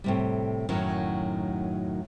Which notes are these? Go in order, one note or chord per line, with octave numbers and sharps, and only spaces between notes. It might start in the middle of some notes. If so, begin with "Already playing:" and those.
A2 C3 G3
F#2 A2 D#3 F#3 C#4